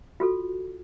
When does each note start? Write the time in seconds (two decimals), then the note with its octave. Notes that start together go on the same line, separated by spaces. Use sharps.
0.20 F4 F#4 A4